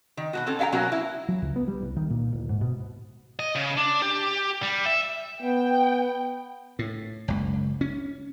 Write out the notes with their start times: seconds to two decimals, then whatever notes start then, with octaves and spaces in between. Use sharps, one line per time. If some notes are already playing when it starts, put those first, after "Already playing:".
0.17 D#3
0.33 B2 A3 F#4
0.46 C4 C#4 A4
0.59 C#4 E5 F5 G5 A#5
0.72 B2 F#3 A#3 C#4 F#4 A#4
0.92 E4
1.28 F#3
1.42 C#2
1.56 B3
1.68 G3
1.82 C2
1.96 D#3
2.10 A#2
2.32 D1
2.49 G#2
2.61 B2
3.39 D#5
3.55 C#3
3.77 D4
4.02 G4
4.63 G3
4.86 E5
5.42 B3 G5
6.79 A2
7.28 F#1 C#2
7.81 C#4